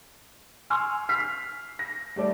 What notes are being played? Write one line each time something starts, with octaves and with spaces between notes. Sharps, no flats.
G#5 C6 C#6 E6 F6
F6 B6 C7
A#6
G3 A3 D5